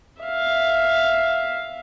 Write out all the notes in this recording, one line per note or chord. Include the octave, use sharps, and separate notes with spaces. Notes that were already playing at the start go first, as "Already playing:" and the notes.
E5 F5